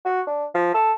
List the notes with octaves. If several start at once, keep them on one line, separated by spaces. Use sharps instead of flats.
F#4
D4
F3
A4